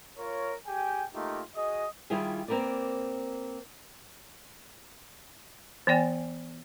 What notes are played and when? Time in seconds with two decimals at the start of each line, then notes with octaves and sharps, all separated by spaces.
0.17 F4 A#4 C#5
0.66 G4 G#4 G5 G#5
1.14 A3 A#3 D#4 F4 G4
1.55 F#4 G#4 D#5
2.10 D#3 G3 E4 F4 G4 G#4
2.48 A#3 C4 A#4 B4 D5
5.87 E3 B3 D5 G5 G#5